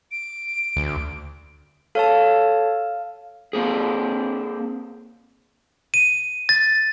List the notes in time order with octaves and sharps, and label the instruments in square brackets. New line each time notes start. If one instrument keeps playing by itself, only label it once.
[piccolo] D7
[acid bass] D2
[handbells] A4 C#5 A5 [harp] F5
[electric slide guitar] A#3 C4 G#4
[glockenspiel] D#7
A6